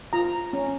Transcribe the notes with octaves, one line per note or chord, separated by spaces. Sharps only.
F4 A#5
C#4